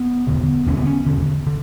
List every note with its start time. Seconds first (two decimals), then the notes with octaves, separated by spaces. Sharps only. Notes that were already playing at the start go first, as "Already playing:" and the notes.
Already playing: B3
0.27 E1 D2 D3
0.67 E1 D2 D3 C#4
0.77 B3
0.87 C#4
1.06 E1 D2 D3
1.47 D3